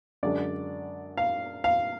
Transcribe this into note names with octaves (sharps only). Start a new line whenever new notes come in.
F#2 D3 G#3 D4 D5
F5
F5